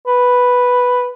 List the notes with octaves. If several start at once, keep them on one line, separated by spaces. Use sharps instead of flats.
B4